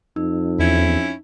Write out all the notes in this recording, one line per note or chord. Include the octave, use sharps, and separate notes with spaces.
F2 D#4
E2 C#4 E4